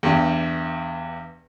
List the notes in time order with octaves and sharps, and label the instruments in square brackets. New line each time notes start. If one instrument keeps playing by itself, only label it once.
[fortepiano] E2 G2